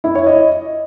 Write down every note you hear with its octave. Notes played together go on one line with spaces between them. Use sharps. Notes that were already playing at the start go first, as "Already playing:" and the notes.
E4
C#5
D#5